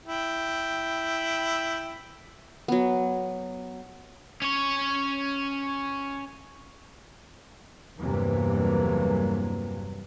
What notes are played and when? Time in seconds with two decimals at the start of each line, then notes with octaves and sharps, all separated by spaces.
0.06 E4 G5
2.68 F#3 B3
4.42 C#4 C#5
7.99 E2 G2 C3 E3 F#3 A#3